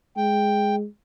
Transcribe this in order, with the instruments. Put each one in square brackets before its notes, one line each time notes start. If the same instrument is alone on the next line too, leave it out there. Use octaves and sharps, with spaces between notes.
[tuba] G#3 [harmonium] G5